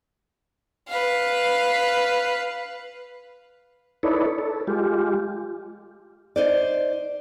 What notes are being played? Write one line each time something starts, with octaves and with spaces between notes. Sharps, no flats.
B4 F5
D#4 E4 A4 B4 C#5 D5
A4
G#3 F4 G4
D#4 C5 D5